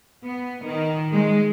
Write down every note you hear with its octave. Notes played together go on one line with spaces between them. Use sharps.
B3
D#3
G#3